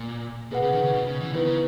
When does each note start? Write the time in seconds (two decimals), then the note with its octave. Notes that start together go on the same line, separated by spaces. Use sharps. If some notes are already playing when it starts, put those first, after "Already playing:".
Already playing: A#2
0.51 B2 G#4 B4 F#5
0.62 C#3
0.72 D#3
0.83 C#3
0.93 B2
1.07 C#3
1.21 E3
1.33 D#3 B3 E4 B4
1.45 C#3